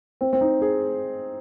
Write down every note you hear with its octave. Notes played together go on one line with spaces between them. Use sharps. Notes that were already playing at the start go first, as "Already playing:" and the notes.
C4
C4
D#4
G#4